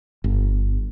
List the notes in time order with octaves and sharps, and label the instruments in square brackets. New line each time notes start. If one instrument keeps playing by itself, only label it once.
[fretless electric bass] G1